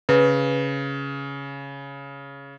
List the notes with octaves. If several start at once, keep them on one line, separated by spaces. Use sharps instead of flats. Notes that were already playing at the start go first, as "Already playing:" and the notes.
C#3 B4